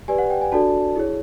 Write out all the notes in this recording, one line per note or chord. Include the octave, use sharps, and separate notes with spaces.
G4 B4 D5 G#5
F#5
G5
G#5
D4 F#4 A4 D5 A5
E4 G#4 C#5